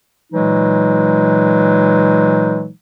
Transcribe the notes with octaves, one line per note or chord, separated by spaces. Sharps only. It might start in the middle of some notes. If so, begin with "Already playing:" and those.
A#2 E3 F#3 G#3 D#4